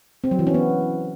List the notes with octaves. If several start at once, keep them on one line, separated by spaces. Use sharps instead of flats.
C4
F#3
E3
C#4
B3